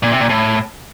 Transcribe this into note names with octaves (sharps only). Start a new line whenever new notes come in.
A#2
C3
A#2
A2